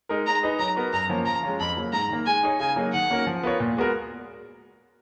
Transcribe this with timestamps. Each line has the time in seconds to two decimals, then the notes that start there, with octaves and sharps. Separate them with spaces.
0.09 G#3 D#4 A#4
0.26 G#3 A#5
0.43 D#4 G#4 B4 D#5
0.59 F#3 A#5
0.76 B3 F#4 A#4
0.93 F#2 A#5
1.10 F3 A#3 C#4
1.26 F3 A#5
1.43 G#3 C#4 F4
1.60 F2 B5
1.77 C#3 F#3 A#3
1.93 G#2 A#5
2.09 D#3 A#3
2.26 G#3 G#5
2.43 D#4 G#4 C#5
2.60 C#3 G#5
2.76 F#3 A#3 D#4 G#4
2.93 D#3 F#5
3.10 A#3 C#4 F#4 A#4
3.27 F3
3.43 B3 F4 A#4 C#5
3.60 A#2
3.77 G#3 B3 F#4 A#4